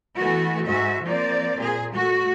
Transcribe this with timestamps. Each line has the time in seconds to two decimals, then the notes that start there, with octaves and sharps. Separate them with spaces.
0.17 E3 A3 B3 F#4
0.66 G#2 F#4 E5
1.03 F3 A#3 C4 D5
1.62 A#2 G#4
1.94 A3 F#4